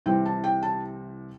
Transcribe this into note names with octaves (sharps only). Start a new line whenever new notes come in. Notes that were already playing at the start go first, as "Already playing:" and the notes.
C2 C3 E3 G3 C4 G5
A5
G5
A5